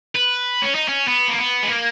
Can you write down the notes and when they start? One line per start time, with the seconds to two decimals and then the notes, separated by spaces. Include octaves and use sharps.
0.16 B4
0.62 C#4
0.75 D#4
0.88 C#4
1.08 B3
1.28 A#3
1.39 B3
1.63 G#3
1.69 A#3